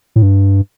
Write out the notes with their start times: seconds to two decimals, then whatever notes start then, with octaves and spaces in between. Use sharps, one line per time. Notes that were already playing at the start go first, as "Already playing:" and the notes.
0.16 A2
0.22 G2